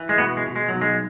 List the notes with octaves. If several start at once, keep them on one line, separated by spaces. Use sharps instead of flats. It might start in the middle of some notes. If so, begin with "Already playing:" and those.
Already playing: E3
G#3
B2 B3
G#3
B2
G#3
F#3
B1
G#3